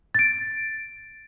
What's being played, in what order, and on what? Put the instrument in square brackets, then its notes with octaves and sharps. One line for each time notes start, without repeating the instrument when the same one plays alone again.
[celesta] A6 D7